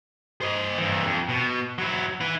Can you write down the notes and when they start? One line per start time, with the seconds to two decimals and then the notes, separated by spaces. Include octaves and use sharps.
0.41 C5 D#5
0.78 G2 E3
1.05 F2
1.29 B2
1.78 F#3 E4
2.21 E4 B4